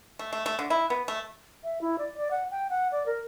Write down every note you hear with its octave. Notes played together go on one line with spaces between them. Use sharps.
A3
A3
A3
D3
E4
B3
A3
E5
E4
D5
D5
F#5
G5
F#5
D5
A#4